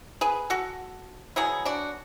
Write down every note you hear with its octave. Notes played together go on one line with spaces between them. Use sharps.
G#4 B4
F#4 A4
B2 F#3 B3 E4 G#4
D4 F#4